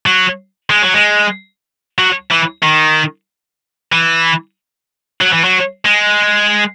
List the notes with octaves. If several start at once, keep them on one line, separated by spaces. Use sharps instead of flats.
F#3
G#3
F#3
G#3
F#3
E3
D#3
E3
F#3
E3
F#3
G#3